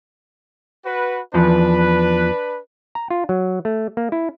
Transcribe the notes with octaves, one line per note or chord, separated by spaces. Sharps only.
F#4 B4
E2 F3 D4 B4
A#5
F4
F#3
A3
A#3
E4